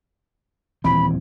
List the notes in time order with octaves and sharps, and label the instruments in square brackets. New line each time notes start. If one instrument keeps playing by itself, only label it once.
[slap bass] D#1 E3 C4 [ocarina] B5